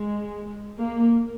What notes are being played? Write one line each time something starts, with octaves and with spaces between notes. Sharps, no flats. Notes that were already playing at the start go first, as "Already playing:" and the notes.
Already playing: G#3
A#3